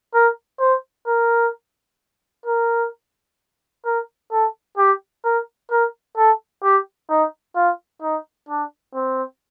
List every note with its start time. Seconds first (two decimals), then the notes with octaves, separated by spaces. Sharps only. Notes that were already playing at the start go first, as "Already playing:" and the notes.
0.14 A#4
0.60 C5
1.07 A#4
2.46 A#4
3.85 A#4
4.31 A4
4.78 G4
5.24 A#4
5.70 A#4
6.17 A4
6.63 G4
7.10 D#4
7.56 F4
8.02 D#4
8.49 D4
8.95 C4